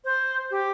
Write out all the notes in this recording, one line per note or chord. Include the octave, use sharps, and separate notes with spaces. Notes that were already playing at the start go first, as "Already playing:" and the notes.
C5
G4